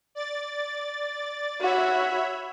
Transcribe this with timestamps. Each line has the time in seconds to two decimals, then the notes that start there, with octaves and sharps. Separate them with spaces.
0.15 D5 A6
1.61 F#4 C#5 E5 B5